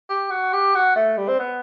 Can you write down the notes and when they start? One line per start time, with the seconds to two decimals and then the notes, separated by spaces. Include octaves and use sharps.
0.10 G4
0.31 F#4
0.53 G4
0.75 F#4
0.96 A3
1.18 G3
1.28 C4
1.39 B3